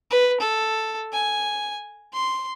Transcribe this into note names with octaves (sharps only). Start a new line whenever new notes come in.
B4
A4
G#5
C6